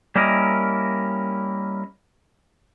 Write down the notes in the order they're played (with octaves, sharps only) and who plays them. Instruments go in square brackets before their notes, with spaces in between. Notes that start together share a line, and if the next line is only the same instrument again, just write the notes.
[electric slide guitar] G3 A#3 C#4 E4 A#4 D#5